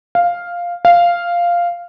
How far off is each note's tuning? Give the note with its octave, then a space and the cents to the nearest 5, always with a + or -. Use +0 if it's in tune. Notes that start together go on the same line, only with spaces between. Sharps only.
F5 +0
F5 -5